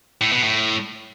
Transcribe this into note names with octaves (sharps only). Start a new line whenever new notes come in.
A2
B2
A2